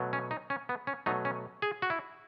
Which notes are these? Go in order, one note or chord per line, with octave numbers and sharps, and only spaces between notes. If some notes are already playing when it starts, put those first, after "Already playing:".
Already playing: B2 F#3 A3
C#4
D#4
C#4
B3
C#4
B2 F#3 A3 D#4
C#4
G#4
F#4
E4